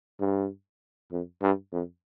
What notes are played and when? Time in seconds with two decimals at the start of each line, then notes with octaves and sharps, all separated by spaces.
0.20 G2
1.11 F2
1.42 G2
1.72 F2